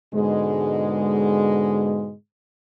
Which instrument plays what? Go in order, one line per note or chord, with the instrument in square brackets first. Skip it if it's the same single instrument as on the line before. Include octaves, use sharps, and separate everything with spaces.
[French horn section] G#2 B2 D3 G#3